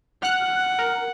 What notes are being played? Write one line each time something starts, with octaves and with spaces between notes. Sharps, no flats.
F#5 F6 F#6
A#4